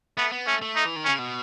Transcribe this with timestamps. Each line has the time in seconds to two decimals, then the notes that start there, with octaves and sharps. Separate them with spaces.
0.17 A3 B3
0.32 B3
0.47 A3 C#4
0.62 A3
0.76 D#4
0.85 E3
0.96 D#3
1.05 C#3 C#4
1.19 B2